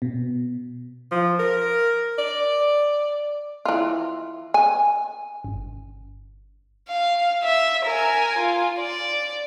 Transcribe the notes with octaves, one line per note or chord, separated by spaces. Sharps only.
B2
F3
A#4
D5
E3 F4
G#5
G1
F5
E5
A#4 G#5
F4
D5